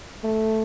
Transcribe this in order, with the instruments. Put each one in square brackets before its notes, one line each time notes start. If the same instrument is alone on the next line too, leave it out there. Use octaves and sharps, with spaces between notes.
[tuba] A3